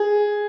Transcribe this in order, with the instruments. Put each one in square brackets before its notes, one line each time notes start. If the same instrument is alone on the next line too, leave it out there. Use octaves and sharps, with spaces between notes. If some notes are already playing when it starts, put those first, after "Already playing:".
Already playing: [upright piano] G#4